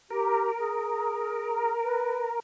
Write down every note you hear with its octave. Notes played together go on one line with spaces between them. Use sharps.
G4 A#4
G#4
B4